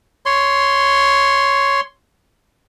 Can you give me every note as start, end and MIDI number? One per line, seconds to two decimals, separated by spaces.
0.26 1.80 73
0.26 1.80 84